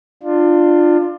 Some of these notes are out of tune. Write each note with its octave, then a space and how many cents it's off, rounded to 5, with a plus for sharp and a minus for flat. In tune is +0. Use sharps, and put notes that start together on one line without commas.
D4 +25 F4 +0